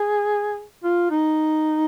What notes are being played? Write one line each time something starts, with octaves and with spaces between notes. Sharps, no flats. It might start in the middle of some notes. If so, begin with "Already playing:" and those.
Already playing: G#4
F4
D#4